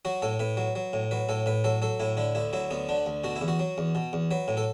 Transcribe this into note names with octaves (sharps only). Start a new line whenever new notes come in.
F#3 F#4
A2 A4
A2 B4
F#3
F#3
A2
F#3 B4
A2 A4
A2 B4
F#3 A4
F#3 A4
A2 E4
D3 E4
D2 E4
F#3 E4
D2 B3
D3 D4
D2
B2 F#4
E4
E2
F#4
F#3
E2
B2
E2
F#3 B4
A2
A4